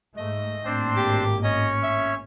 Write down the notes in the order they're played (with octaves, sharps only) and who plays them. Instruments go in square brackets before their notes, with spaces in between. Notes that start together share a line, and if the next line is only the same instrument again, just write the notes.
[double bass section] G#2 A3 [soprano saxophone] D#5
[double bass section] G#1 A2 A#3 [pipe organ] C4 D4 C5
[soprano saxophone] G4
[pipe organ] C#4 C#5 [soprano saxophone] D#5
[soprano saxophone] E5